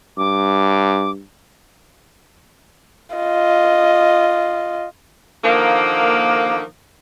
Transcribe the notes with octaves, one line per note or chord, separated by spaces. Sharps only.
G2 D6
F4 D#5
D3 D#3 F3 A#3